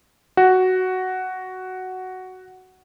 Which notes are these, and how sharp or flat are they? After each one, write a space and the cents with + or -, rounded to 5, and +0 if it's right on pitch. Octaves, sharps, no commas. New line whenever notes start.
F#4 +5